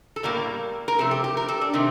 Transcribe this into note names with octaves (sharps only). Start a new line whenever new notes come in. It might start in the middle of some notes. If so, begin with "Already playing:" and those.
A4
A2 G3 A#3 A#4
A#4
C3 F3 A3 A4
G4
G4
A#4
A4
D4
C3 D#3 A3 C4